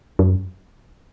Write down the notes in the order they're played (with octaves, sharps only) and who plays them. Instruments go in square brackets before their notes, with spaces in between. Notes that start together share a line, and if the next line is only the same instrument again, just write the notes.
[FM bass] F#2